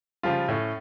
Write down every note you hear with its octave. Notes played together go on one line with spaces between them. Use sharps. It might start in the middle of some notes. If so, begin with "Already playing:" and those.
C#3 F3 G3 F4
A2 C#4